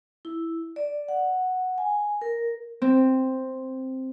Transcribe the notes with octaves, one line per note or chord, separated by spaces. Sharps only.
E4
D5
F#5
G#5
A#4
C4